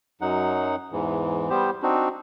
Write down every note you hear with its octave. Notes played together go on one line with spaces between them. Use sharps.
F#2 F#3 D#4 F#5
E2 G#2 E3
G3 B3 G4 C5
C4 D4 D#4 F#4